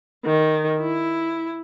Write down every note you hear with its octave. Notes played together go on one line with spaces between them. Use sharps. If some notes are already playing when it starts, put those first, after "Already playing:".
D#3
E4